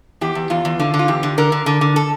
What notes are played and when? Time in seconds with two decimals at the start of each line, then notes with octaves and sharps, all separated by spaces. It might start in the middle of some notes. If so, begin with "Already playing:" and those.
0.21 E2 G4
0.35 E2
0.50 E2 F4
0.65 E2
0.80 D3 F4
0.94 D3
0.99 F4
1.08 E2 G4
1.23 D3
1.38 D3 A#4
1.52 D3
1.66 D3
1.81 D3
1.96 A4